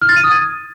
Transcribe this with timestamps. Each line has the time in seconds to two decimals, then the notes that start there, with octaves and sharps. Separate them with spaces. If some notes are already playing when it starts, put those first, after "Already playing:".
0.01 F6
0.09 A6
0.16 D#7
0.24 D#6
0.31 G#6